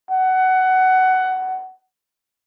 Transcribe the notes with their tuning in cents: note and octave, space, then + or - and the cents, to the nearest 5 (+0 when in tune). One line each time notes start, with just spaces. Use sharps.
F#5 +15